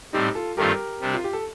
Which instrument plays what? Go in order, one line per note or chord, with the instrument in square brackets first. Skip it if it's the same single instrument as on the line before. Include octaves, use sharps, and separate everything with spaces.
[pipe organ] A2 G3 C4 [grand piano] D#4 G4
[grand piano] F4 A4
[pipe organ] G2 D#3 A3 C4 F4 [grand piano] G4 A#4
[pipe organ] C3 G3 D4
[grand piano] F4
G4
A4